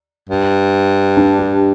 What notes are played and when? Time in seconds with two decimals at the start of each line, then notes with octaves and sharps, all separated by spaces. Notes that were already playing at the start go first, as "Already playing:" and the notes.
0.29 G2
1.17 D4
1.39 G4